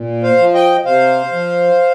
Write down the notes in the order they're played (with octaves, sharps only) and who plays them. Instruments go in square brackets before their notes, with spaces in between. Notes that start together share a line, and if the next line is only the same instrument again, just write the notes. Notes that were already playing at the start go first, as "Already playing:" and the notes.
Already playing: [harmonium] A#2
C5 F5
F3
D#5 G5
C3 C5 F5
F3